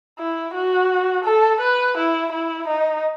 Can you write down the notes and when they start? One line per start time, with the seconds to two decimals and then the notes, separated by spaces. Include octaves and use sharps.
0.18 E4
0.54 F#4
1.25 A4
1.60 B4
1.97 E4
2.32 E4
2.68 D#4